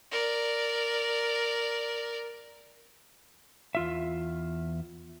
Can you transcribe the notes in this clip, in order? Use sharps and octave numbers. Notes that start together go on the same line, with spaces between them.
A#4 D5
E2 F4 E5